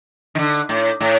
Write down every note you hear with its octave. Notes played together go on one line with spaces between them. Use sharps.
D#3
D3
A2
A2